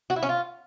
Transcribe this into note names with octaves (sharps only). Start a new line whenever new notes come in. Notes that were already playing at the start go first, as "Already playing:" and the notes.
F#4
E4
C#4
F4